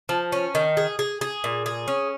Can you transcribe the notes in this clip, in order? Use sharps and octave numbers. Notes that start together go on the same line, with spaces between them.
F3
C#4
D#3
G#4
G#4
G#4
A#2
G#4
C#4